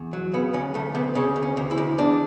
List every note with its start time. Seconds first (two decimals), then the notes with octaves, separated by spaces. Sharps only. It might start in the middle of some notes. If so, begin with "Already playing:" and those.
Already playing: E2
0.13 F#3
0.33 C#3 B3
0.53 D2 C#4
0.74 D2 A3
0.95 D2 B3
1.15 C#3 C#4
1.36 D2
1.43 C#4
1.57 D2
1.71 E4
1.78 D2
1.98 E2 D4